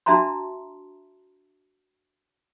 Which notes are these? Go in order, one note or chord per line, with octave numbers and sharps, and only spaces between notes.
D4 F#4 E5 A5 A#5 C6